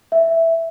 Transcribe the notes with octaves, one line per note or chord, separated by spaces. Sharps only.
E5